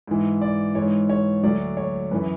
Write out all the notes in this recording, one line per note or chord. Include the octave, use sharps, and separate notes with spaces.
G#2 E3
D5
G#2 E3 C#5
C#5
D2 D3 F#3 D5
C#5
F#2 E3 B4